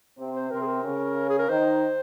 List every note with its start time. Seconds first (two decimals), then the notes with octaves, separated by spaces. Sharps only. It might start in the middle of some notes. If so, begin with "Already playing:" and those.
0.18 C3 C4
0.35 C5
0.51 C3 C4 A#4
0.62 G#4
0.67 A#4
0.84 C#3 C#4
1.30 G#4
1.39 A#4
1.49 D#3 D#4 C5